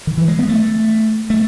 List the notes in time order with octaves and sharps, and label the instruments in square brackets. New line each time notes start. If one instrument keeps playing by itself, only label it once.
[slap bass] D#3
E3
G#3
B3
A3
A3